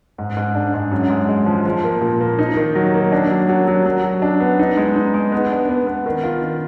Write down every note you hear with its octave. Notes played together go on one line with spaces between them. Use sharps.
G#2
G#2
D4
G#2
F#2
G#3
G#3
F3
F3
A#3
A#2
A#3
D#4
D#3
F#3
A#3
D4
F#3
F#3
F#3
F#3
F#3
D4
B3
D#4
G#3
D#4
G#3
B3
D4
B3
B3
D#3
F4
D#3